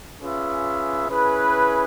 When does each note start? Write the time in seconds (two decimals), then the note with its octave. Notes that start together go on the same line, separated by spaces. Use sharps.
0.20 C#4 F4 G#4 B4 E5
1.08 C#4 E4 G#4 B4